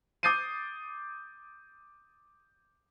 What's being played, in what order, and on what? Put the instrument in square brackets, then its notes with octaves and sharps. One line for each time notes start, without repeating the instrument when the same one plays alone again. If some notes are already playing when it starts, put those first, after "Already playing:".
[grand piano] D6 D#6 G6 A6 C7 D#7